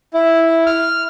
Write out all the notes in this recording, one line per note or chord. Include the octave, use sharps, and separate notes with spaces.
E4
F6